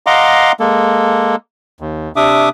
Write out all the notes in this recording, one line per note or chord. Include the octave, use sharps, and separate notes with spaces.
D#5 F5 F#5 A#5 C6 D6
G#3 A#3 A4
D#2
C3 D4 E5 D6 D#6